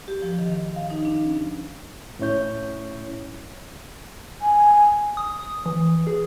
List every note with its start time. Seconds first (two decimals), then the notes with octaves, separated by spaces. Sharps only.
0.08 G4
0.22 F3
0.39 D#3
0.54 D#3
0.76 F5
0.90 D#4
1.05 D4
1.22 C#4
2.19 A2 C#4 E4 C#5 G6
4.41 G#5
5.17 D#6
5.66 E3
6.07 G#4